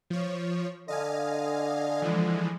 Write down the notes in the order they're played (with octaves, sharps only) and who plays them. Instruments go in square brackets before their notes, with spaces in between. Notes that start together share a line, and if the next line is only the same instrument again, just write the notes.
[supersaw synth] F3 C#5
[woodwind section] D3 [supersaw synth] D#5 F5 G#5
[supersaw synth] E3 F3 G#3